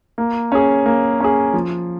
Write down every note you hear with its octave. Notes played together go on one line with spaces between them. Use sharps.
A#3
C#4 G#4
A#3
C#4 G#4
F3